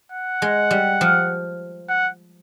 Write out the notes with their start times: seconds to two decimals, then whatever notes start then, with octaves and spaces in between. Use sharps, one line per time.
0.12 F#5
0.42 G#3
0.71 G3
1.01 F3
1.89 F#5